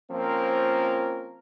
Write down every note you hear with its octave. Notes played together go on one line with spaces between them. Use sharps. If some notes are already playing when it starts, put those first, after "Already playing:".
F3 A#3 C4 C#4 F4 A#4